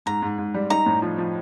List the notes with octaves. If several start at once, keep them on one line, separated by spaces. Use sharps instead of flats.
G#2 A#5
G#2
G#2
G3
D#4 A#5
A2
F3
F3